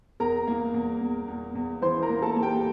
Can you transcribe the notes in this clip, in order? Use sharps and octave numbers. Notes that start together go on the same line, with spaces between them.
E2 A#4 A#5
A#3
E2
E2
E2
E2
E3 C5 C6
A#4 A#5
A#3
A4 A5
A#3
G4 G5